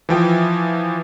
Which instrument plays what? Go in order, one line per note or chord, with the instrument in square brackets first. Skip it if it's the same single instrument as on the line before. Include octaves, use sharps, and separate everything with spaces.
[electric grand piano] E3 F3 G5